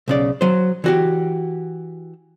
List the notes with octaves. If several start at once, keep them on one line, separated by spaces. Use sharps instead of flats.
B1 C#3 D5
F#3 C5
E3 F#4 G4